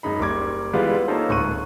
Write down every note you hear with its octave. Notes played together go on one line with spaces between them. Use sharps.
F#2 G#3 D#4 B5
F#1 G3 D6 G#6
E3 G3 G#3 B3 F4
A#3 C#4 D#4 F4 A4 C5
D1 G#2 C#6 F#6 D#7